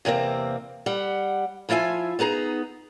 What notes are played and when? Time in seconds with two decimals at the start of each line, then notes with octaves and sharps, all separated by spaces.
0.05 E2 C3 A#3 C4
0.86 G3 F#5
1.69 F3 E4 F4 E5 G#5
2.19 B3 D#4 G#4 A#5